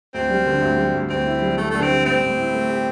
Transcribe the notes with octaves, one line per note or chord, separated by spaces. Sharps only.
D2 C4
G3
D3
D2
G3
D2
D2 C4
E4
G3
G3 A3
D3 A3
C4
G3
A2 C4
A2
E4
A3
G4